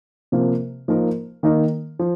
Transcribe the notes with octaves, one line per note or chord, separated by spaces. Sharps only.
C3 F3 A#3
F3 A#3 D#4 A#4
D#3 A#3 D#4
F3